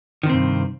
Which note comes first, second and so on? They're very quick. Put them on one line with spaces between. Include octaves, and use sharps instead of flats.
D#3 C3 C4 G2